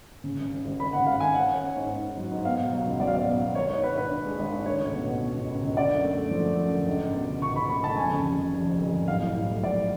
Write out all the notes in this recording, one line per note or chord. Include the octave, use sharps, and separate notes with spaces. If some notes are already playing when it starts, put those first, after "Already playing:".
C#3
G#1
G#1
G#1
G#1 B5
C#3 F#5
G#1 F5
G#1 G#5
C#4 F#5
C#4
C#4
G#2
G#2
G#2
F#3
G#2
B3 F5
B2
F#3
C#2
F#3 D5
F5
B2 D5
B3
B2
G#1 C#5
G#2 C#5
G#2 B4
D4 B4
D4
G#3
G#1
D4
A3 C#5
C#2
B2
B2
B2
C#2
C#2
C#2
D3 D5
F#2
A3
A3
F3
A3
F#2
D3
C#2
C#2
B2
C#2
C#2 C#6
C#2 B5
A3 B5
C#2 A5
F2 G#5
C#3
F1
F1
F1
F2
F1
F1
B1 F5
A2
A2
B1
B1 D5